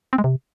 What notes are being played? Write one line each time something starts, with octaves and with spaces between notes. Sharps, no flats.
C4
G#3
C3